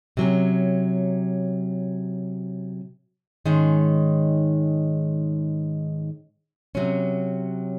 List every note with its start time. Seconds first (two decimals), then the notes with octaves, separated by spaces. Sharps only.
0.17 C3 F#3 C#4
3.45 G#2 D#3 G#3 C#4
6.75 C3 F#3 C#4